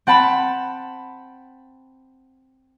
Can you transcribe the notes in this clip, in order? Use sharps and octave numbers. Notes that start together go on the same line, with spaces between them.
C4 F#5 A5 B5